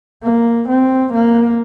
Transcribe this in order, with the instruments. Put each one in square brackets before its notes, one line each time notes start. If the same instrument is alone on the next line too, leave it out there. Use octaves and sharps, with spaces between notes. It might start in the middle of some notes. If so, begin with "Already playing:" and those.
[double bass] A#3
C4
A#3